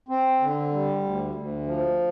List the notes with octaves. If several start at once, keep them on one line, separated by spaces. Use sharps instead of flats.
C4
D3
G3
D2
D2
F3